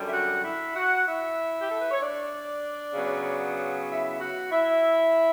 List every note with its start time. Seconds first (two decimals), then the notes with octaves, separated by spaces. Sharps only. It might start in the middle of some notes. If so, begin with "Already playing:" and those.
Already playing: F#2 D3 G3
0.09 E5
0.13 F#4 F#5
0.44 E4 E5
0.75 F#4 F#5
1.07 E4 E5
1.60 G4
1.70 A4
1.81 B4
1.91 C#5
2.01 D4 D5
2.94 C#3 F#3 B3
3.88 E4 E5
4.20 F#4 F#5
4.52 E4 E5